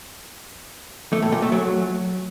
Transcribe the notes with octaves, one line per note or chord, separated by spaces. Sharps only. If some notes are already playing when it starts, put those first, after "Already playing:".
A3
A2
A#2
A3
F#3